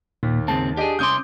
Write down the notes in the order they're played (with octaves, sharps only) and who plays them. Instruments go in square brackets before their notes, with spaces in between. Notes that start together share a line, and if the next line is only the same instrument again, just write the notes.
[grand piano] D#2 [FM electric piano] A#2
[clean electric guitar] G#2 C#3 C4 [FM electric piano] A5
[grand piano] D4 D#5 [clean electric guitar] G4 G#4
[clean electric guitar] C2 C#4 C6 [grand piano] D6 D#6 G6